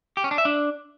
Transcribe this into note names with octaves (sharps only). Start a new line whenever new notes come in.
G4
C#4
D4
E5
D4